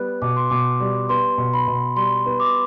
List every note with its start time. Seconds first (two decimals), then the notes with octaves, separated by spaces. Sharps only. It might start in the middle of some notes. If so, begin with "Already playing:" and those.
Already playing: G3 B3 F#6
0.22 B2 D6
0.36 C6
0.50 B2 D6
0.80 G3
1.09 B3 C6
1.38 B2
1.54 B5
1.68 B2
1.96 G3 C6
2.26 B3
2.40 D6